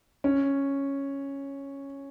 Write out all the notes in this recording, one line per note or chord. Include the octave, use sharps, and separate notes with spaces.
C#4